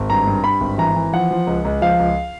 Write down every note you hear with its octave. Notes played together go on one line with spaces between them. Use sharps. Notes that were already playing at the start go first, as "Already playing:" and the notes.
Already playing: G#1
G2 A#5
G2
G2 B5
G#1
E3 A#5
E3
F3 F#5
F3
C#2
C#2
F3 F5
C#2